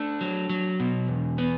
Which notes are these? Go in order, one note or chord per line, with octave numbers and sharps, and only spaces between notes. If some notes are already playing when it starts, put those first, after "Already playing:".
Already playing: A3 D4 D5
F#3
F#3
B2
E2
B3